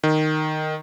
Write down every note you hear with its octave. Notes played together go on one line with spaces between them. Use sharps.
D#3